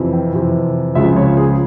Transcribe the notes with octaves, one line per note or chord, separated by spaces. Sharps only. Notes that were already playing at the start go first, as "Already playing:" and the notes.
Already playing: F2 C3 E3
G5
F2 C3 E3
C#2 C#3 F3 E5
C#5
G#4